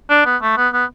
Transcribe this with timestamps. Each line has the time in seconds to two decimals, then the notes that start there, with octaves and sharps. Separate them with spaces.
0.10 D4
0.25 B3
0.42 A3
0.57 B3
0.73 B3